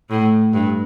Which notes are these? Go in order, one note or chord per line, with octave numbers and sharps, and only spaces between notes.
A2
G2